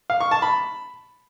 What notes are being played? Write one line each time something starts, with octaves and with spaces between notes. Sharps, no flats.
F5
C#6
A5
B5